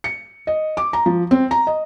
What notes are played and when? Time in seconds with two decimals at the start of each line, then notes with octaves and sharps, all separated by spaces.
0.04 C#7
0.47 D#5
0.77 D6
0.93 A#5
1.06 F3
1.31 C4
1.51 A#5
1.67 D#5